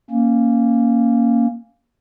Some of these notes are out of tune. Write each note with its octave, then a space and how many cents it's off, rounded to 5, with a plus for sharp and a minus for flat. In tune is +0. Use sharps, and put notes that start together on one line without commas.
A#3 +0 C#4 -5